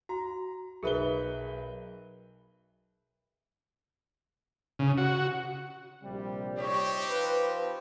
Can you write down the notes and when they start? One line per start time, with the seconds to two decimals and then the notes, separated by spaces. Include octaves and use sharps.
0.09 F#4 A#5
0.83 B1 G#4 A#4 B4 E5 G7
4.79 C#3
4.98 F#4
6.02 A#1 C3 G3
6.58 C4 D#4 G4 C#5
7.10 F3 B4